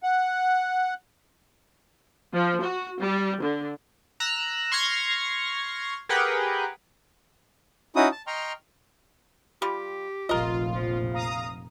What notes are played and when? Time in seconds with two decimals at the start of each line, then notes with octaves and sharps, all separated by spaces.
0.03 F#5
2.34 F3
2.62 F#4
3.00 G3
3.42 D3
4.20 A#5 E6 F#6
4.72 C6 C#6 F6 G#6 A#6 C7
6.09 G4 G#4 A#4 B4 F#5 G5
7.96 C#4 D#4 E4 F#4 D#6
8.12 A5
8.27 D#5 G5 A#5 C6 C#6 F6
9.62 G3 F4 G4
10.29 F1 A#1 F4 A#4 D#5
10.76 F3
11.13 F5 A#5 D#6